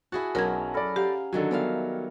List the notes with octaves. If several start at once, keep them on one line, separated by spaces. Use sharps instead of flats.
E4 F#4 G#4 A5
B1 F#3 C#4 E4 A#4 A5 G#6
A4 D5 B5 F6 A#6
G4 F5 F#5 A#5
D3 D#3 F#3 A4 G#5
D#3 G3 B3 A#4 E5 F5